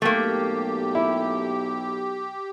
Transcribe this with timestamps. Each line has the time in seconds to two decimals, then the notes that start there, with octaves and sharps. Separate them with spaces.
0.02 B1 A3 A#3 G4
0.95 E4